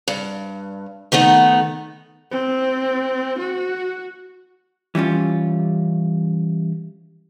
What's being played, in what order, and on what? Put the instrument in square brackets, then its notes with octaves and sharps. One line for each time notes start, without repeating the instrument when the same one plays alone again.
[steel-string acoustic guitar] G2
D#3 A3 B3 D#4
[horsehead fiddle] C4
F#4
[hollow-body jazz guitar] E3 G3 C#4 F4